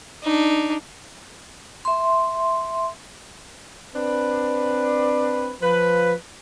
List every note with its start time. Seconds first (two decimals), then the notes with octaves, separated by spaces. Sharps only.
0.23 D4 D#4
1.85 E5 C6
3.95 C4 D4 B4
5.61 F3 B4